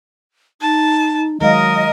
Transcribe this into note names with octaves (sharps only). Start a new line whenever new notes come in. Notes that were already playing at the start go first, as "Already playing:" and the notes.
D#4 A5
D#3 F#3 G#3 A#4 D#5 F5